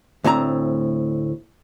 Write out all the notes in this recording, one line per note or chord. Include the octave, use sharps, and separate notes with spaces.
D2 A2 C4 A#5